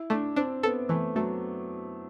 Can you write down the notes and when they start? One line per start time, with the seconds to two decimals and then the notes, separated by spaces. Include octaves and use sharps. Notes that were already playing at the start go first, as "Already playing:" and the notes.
Already playing: E4
0.10 A3 D4
0.36 C4 D4
0.63 B3 A4
0.89 E3 A3
1.15 F#3 A3